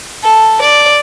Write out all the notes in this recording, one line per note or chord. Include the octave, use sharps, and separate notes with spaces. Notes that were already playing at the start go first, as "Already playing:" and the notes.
A4
D5